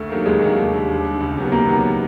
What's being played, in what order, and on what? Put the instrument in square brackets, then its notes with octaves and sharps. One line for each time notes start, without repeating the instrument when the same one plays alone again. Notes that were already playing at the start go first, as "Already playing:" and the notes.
Already playing: [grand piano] D2 [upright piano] A3
[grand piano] C3 D#3 F#3 A#3
[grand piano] D2 [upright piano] G#3
[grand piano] C3 D#3 F#3 A#3
D#2
D3 G3
D#2
D3 G3
C#2
C3 D#3 F#3 B3
[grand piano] C#2 [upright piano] A#3
[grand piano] C3 D#3 F#3 B3